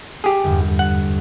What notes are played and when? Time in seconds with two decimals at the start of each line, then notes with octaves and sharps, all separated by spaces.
0.24 G4 G#4
0.44 G1 E2 G2 G3
0.79 F#5